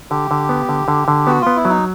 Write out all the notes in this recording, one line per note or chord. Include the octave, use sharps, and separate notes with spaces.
D3 G4
D3
B3
D3
D3
D3
B3 F#4
B3 F4
E4
F#3 D#4